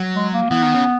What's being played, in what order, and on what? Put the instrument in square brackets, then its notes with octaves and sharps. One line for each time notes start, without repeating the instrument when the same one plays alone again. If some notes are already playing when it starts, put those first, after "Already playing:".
Already playing: [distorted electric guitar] F#3
[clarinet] G#3
A#3
[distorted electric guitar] E3 [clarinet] B3
[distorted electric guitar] D#3
C#3